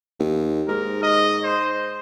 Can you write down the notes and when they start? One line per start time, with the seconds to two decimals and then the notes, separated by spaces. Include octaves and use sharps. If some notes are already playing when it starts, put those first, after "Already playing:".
0.19 D#2
0.68 G#2 A#4
1.03 D#5
1.44 C5